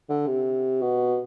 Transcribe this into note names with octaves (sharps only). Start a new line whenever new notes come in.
D3
C3
B2